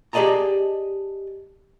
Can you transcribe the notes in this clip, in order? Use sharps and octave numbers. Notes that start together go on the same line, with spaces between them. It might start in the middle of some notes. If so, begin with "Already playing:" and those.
G4 G#4 D5 D#5 A5 A#5